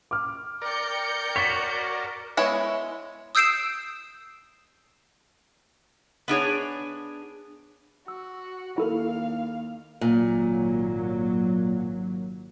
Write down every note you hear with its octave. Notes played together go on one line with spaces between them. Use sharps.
D6 F6
A#4 D5 G5 G6 C#7
F#4 C#5 A6 B6
G#3 B3 E4 C#5 E5
D#6 E6 G6 C7 D7 E7
B3 D4 G#4 C#5
F#4 E6
D#2 E4 A4 A#4 F5
G#1 A#2 F#3 A#3